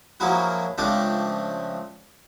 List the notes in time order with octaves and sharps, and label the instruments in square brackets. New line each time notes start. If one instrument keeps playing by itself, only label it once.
[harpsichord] F3 F#3 G#3 A#3 E4 F#4
C#2 F3 A3 C4 D4 D6